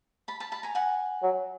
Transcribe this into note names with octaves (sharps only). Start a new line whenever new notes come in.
A5 B5
A5 B5
A5 B5
G#5 A#5
F#5 G#5
F#3